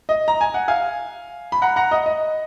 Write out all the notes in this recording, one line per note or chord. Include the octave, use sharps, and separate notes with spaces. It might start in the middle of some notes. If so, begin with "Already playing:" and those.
D#5
A#5
G#5
F#5
F5 G#5
B5
F#5 A#5
F#5 A#5
D#5
D#5